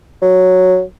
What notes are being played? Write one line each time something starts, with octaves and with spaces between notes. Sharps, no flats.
F#3